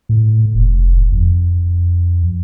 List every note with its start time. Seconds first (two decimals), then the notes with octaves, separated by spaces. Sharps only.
0.09 A2
0.54 F1
1.12 F2